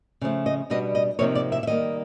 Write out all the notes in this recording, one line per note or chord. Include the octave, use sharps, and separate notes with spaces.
C#3 F3 A3
D#5
B2 G3 B3 D4 D#5
D#5
C3 F3 A#3 D#4 C#5
D5
E5
E5
D#3 G3 A#3 D#5